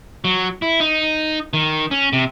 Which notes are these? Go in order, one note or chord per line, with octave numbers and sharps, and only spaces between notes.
F#3
E4
D#4
D#3
C#4
C3